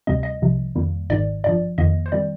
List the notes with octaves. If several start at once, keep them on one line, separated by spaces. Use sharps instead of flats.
D2 C3 G3 C4 D#5
D#5
C2 C3 F3
F2 D#3 G3 A#3
G#1 G#2 D#3 D5
G#1 G2 F3 D5
F2 D#3 A#3 D#5
C5
D#3 G3 C4 D5